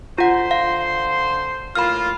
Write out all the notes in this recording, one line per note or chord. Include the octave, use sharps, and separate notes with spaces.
D3 F4 C5 F#5 C6
F5
A2 A#3 F4 B5 F6